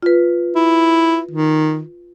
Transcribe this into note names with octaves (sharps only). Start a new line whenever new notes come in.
F4 B4
E4
D#3